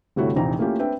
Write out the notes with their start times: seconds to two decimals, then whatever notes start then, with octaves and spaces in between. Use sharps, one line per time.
0.16 G1 C3 A3 E4 F#4 C#5
0.36 F1 A#1 E3 C4 D#4 A#5
0.58 A3 A#3 C#4 E4 F4 G4
0.79 C4 D4 B4 E5 G5